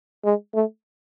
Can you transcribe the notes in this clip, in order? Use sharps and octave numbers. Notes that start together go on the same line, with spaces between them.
G#3
A3